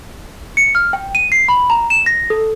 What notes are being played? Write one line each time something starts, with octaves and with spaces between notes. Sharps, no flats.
C#7
F6
G5
D#7
C7
B5
A#5
E7
A#6
A4